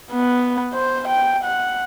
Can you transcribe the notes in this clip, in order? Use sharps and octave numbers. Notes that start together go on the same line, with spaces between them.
B3
C5
G5
F#5